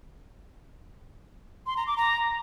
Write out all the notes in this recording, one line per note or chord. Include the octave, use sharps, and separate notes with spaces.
C6
A#5
D6
A#5